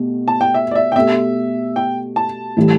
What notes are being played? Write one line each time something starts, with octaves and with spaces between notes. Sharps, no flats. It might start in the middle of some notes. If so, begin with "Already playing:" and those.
Already playing: B2 A3 G4
A5
G5
E5
D5
E5
G5
B2 A3 G4 E5
G5
A5
A2 E3 G3